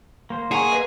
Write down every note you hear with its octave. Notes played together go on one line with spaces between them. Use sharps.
A#3 C5
G#4 F#5 A#5 C#6
B4 D#5